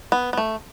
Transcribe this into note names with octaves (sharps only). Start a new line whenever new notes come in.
B3
B3
A3